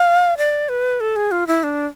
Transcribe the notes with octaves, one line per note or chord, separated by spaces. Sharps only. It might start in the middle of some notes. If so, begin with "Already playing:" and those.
Already playing: F5
D5
B4
A4
G#4
F4
E4
D4